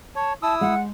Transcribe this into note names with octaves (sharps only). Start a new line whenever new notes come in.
C#5 A5
E4 A5 D#6 E6
G#3 F#5